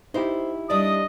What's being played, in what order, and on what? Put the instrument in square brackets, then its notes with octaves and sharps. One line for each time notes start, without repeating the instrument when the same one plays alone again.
[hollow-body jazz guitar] D#4 E4 G4 [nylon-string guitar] C5
[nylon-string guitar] G3 D4 D5 [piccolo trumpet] D#5 [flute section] D#6